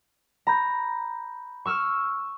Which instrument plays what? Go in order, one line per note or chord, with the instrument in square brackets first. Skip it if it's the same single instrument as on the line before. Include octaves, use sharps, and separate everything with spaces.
[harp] A#5 [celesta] B5 G6
[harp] C#6 E6 F6